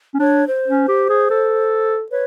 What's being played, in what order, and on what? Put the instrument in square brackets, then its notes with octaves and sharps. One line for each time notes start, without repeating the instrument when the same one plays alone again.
[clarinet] C#4
[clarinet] D4 [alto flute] C#5
[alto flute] C5
[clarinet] C#4
G4
G#4
A4
[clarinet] B4 [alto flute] C#5